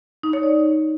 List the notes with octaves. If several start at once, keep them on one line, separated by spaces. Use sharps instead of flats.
D#4
C#5
D5